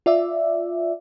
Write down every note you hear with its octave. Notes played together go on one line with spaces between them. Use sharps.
F4 D5 E5